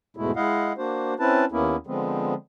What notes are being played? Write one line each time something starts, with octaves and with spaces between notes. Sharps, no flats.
E2 G#2 B2 G#3 A3 E4
G#3 E4 D#5 F5 F#5
A#3 D4 F#4 C5
C4 C#4 E4 B4 A5
D#2 A#3 B3 C#4 E4
D3 F3 G#3 B3 C4